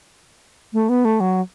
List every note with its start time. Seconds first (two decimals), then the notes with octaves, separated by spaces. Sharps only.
0.73 A3
0.89 B3
1.05 A3
1.20 F#3